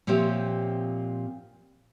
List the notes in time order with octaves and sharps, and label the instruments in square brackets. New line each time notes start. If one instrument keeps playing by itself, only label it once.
[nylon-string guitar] A#2 F3 C4 G4 C#5 E5